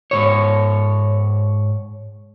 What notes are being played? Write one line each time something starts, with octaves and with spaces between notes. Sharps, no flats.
G#2 B2 C#5